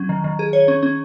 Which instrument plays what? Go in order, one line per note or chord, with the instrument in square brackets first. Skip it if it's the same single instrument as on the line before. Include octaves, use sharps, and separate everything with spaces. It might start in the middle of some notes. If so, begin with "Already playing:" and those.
Already playing: [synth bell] F#3 C#4
D#3
D#3
G#4
C#5
C#4
C#4